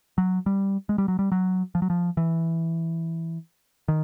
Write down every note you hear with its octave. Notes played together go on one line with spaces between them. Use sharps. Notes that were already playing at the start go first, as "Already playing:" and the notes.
F#3
G3
G#3
G3
F#3
G3
F#3
F3
F#3
F3
E3
D#3